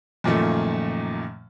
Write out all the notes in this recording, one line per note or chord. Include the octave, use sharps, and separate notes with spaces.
F#2 A#2 D#3 F3 A3